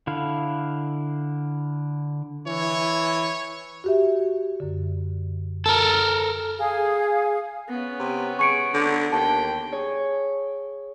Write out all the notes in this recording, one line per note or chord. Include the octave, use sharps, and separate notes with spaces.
D3 E4 F5
E3 C#5
F#4 G4 E5
F#2 D3
A4 A#4 A5
G#4 F5
B3 C#4
C3
G#4 C#6 C#7 D7
D3
D#2 G5 A5
G#4 C#5